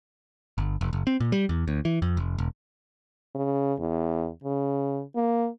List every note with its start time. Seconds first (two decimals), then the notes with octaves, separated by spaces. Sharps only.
0.58 G1
0.81 F1
0.93 F#1
1.07 C4
1.20 A#2
1.32 G3
1.49 E2
1.68 D2
1.85 E3
2.02 F2
2.17 F1
2.38 E1
3.35 C#3
3.80 E2
4.43 C#3
5.16 A#3